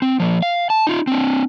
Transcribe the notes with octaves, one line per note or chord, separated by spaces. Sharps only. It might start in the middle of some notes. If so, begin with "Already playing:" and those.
C4
F3 A#3
F5
A5
D#4 F4
C4 D4